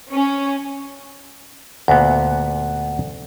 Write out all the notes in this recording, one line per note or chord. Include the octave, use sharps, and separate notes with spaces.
C#4
D2 A#2 B3 F#5